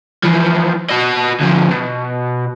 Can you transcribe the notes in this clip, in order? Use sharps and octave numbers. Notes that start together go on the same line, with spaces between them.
E3 F3
F#4 D#5
D2 F3
B2